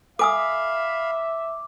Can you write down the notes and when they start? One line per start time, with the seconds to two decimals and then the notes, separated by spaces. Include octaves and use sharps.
0.19 A4 E5 F5 G#5 B5 D6 D#6